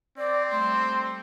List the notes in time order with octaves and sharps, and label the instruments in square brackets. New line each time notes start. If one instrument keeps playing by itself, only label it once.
[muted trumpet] C4 [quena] D5
[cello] G3 A3 [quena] C6